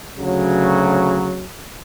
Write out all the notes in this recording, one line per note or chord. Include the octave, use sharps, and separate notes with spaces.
D2 C#3 F#3